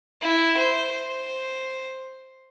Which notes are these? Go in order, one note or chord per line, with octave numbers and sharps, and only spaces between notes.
E4
C5
C5